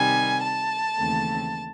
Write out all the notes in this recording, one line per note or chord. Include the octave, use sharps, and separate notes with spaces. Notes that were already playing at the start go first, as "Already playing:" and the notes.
Already playing: C3 D#3 G3 G#5
A5
D#2 C#3 E3 A3 C4